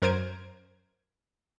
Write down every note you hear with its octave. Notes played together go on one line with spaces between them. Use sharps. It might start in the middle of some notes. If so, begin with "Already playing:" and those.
F#2 A#4 C5 G#6 D7